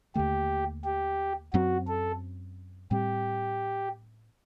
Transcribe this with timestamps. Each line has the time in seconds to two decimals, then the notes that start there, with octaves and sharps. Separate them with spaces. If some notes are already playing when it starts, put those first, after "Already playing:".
0.15 D#2 D3 A3 G4
0.84 G4
1.53 F#2 F#3 C4 F#4
1.88 A4
2.91 A2 G3 C4 G4